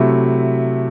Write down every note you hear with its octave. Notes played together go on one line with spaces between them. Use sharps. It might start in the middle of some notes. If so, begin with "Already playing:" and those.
Already playing: C3 F#3 A3 E4